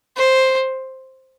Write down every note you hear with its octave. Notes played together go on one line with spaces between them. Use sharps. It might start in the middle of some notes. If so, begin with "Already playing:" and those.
C5